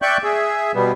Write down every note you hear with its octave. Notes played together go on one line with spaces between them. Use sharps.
D5 E5 G5 C#6 F#6 G6
G#4 E5
B2 G3 B3